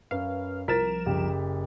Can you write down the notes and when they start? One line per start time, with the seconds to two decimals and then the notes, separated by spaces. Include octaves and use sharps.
0.11 F#2 B4 F5
0.68 C2 F3 A#4 A6 B6 E7
1.06 F#1 G4